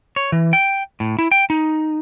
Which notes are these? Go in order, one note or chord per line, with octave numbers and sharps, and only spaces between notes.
C#5
E3
G5
A2
E4
G5
D#4